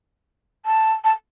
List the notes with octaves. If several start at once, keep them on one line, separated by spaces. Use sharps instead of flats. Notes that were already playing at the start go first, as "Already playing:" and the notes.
A5
A5